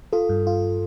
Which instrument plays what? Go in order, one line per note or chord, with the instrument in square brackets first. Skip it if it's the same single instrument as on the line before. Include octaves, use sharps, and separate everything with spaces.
[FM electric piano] F4 [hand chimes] A4
[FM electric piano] G2
F4